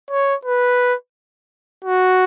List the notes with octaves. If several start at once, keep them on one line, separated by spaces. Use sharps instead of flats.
C#5
B4
F#4